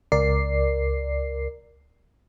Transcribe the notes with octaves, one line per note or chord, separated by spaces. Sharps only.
C#2 A#4 D5 C7